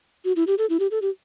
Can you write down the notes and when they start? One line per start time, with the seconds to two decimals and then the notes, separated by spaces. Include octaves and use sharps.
0.25 F#4
0.36 E4
0.47 G4
0.58 A4
0.70 E4
0.80 G4
0.91 A4
1.02 G4